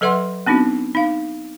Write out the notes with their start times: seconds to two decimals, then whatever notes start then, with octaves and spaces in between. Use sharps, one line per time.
0.01 F#3 A4 B4 E5 F#5 C6
0.47 B3 C4 D4 D#4 F#4
0.95 D#4 F5